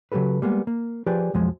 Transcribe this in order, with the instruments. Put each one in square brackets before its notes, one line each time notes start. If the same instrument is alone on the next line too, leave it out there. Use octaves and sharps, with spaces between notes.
[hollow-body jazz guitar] C#3 F#3 G3 G4 A4 B4
G3 G#3 A#3 B3
A#3
F3 F4 G4 G#4 B4 D5
B1 F2 F3 F#3 G#3